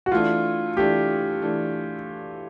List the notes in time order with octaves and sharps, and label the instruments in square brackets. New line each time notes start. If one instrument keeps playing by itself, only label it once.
[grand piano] F#4
[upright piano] E3 A3 D4 [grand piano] F4
[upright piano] E3 A3 D4 [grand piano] G4
[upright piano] E3 A3 D4